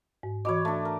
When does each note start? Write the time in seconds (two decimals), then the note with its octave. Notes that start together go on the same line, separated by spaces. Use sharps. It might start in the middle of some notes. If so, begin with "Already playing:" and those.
0.23 G#2
0.45 E3 F#4 C#5 D#5 B5 D6
0.65 A3 D4
0.85 A#4